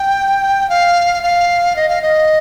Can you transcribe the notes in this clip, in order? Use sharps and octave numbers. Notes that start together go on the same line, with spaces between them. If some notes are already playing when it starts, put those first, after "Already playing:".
Already playing: G5
F5
F5
D#5
F5
D#5